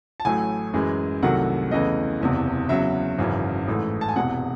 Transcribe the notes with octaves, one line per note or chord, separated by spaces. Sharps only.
A5
A1 A2 F#3 A3 G#5
F#2 E3 G#3
C2 C3 D#3 F#3 A3 F#5
E2 C#3 E3 A3 D#5
F#1 E2 C3
E2 C#3 F#3 E5
G#1 F#2 C#3 E3
A1 G#2 E3 A3
A5
G#5
E1 E2 C3 F#5